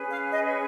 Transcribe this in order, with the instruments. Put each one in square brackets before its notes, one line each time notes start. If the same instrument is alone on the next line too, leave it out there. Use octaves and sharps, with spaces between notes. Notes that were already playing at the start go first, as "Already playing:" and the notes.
Already playing: [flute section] C#4 G#4 B4
F5
D#5